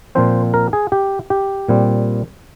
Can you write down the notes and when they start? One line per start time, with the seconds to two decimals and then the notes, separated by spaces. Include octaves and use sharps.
0.15 A#2 F3 C4 C5
0.54 A#4
0.73 G#4
0.92 G4
1.30 G4
1.68 A#2 G3 C4